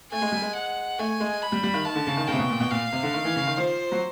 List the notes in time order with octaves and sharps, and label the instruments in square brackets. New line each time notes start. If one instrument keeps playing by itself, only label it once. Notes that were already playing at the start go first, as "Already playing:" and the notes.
[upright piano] A3 [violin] G#5
[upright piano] G#3
G3
G#3
[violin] F#5
[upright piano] A3 [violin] G#5
[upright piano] G#3
[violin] B5
[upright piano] G3
G3
D#3
[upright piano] D#3 [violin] A5
[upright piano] D3
C#3
D#3
[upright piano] C#3 [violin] G5
[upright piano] C3
B2
A#2
B2
[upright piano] A#2 [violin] F5
[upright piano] C3
D3
D#3
E3
C#3
D#3
[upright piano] F3 [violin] C5
[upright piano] F#3